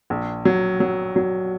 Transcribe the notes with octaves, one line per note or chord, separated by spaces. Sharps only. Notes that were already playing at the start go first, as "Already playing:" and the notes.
A#1
F#3
F#3
F#3